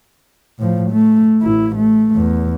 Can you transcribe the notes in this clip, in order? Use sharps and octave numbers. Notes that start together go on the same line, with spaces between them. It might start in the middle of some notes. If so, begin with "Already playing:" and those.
A2 F3
A3
A1 E4
A3
E2